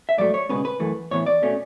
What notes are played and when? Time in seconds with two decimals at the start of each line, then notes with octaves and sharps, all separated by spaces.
0.09 E5
0.18 G#2 F#3 A3 D5
0.34 C#5
0.49 C#2 B2 G#3 C#4 B4
0.65 B4
0.80 F#2 E3 A3
1.11 A2 E3 B3 C#5
1.26 D5
1.42 B2 A3 C#4